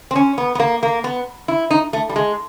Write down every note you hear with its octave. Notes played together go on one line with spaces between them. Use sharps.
C4
C#4
B3
B3
A#3
A#3
B3
E4
D#4
A3
G3
G#3